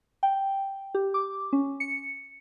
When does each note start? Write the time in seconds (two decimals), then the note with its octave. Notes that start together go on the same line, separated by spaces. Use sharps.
0.23 G5
0.95 G4
1.14 D6
1.53 C#4
1.80 C#7